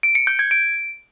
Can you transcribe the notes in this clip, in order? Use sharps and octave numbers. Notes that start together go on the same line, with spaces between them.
D7
C#7
G6
G#6
D7